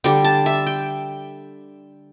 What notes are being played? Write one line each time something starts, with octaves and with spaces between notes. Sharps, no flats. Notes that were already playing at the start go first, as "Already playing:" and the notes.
D3 G3 G5
A5
E5
G5